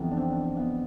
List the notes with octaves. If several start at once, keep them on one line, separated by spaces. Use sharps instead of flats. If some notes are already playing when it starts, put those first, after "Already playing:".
Already playing: F2 C3 E3 G3 B3
D4
C4
D4
C4
B3